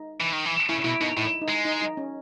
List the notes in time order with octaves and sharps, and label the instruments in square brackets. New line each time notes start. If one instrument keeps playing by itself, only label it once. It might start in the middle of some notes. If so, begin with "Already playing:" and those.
Already playing: [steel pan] D#4
[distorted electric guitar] E3
D#3
E3
[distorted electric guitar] C#3 [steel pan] E4
[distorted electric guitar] B2 [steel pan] E4
[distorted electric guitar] B2 [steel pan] D#4
[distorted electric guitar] A2 [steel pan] E4
[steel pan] D#4
[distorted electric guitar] G#3
[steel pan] D#4
D#4
C#4